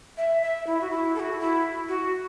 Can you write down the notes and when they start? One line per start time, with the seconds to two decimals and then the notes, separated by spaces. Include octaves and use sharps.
0.17 E5
0.42 E5
0.67 E4
0.81 F#4
0.91 E4
1.15 A4
1.20 F#4
1.40 E4
1.89 F#4